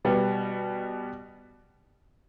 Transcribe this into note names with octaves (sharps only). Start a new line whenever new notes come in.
B2 G3 B3